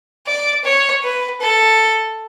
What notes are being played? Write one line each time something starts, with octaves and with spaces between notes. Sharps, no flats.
D5
C#5
B4
A4